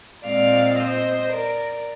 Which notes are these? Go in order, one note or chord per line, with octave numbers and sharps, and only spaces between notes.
A#2 G#3 C4 D5 F5
C5 D#5
A#4 D5